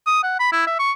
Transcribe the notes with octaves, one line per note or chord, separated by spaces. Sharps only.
D#6
F#5
B5
E4
E5
C#6